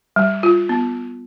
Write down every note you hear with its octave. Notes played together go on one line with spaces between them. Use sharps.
G3
F4
B3